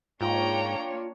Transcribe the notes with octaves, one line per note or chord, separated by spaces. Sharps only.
G#2 A#3 D4 F4 C#5 G5 A#5